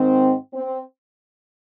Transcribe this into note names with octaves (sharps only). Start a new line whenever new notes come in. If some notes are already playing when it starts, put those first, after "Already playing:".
Already playing: G#2 D#3 C4
C4